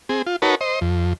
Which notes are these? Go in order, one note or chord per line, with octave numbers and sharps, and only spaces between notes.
C4 G#4
F4
D#4 F#4 A#4 B4 C#5 A5
C5 D#5
F2